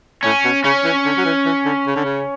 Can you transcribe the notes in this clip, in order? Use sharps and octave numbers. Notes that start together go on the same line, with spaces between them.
A2 C#4
B2
C#3 C#4
E3
D3
F#3
E3
E3
D3
C#3
D3
C#3